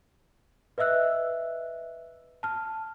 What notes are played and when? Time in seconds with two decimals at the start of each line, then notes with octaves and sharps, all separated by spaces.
0.78 B4 D#5 E5 E6 F#6
2.43 A5 F6